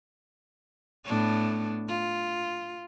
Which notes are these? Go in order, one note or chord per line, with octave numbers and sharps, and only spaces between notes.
A2 B3 D4
F4